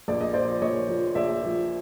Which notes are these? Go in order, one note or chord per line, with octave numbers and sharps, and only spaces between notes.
A#1 D5
D#5
A#2 F3 C5 D5
A#1 C#5 D#5
A#2 F3
A#1 D5 E5
A#2 F3